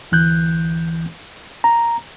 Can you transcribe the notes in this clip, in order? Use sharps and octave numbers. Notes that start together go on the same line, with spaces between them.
D2 E3 F#6 G6
A#5